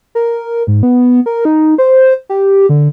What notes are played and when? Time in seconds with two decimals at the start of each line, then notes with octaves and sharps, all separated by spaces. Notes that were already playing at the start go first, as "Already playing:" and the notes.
0.15 A#4
0.67 G#2
0.83 B3
1.26 A#4
1.45 D#4
1.78 C5
2.29 G4
2.69 D3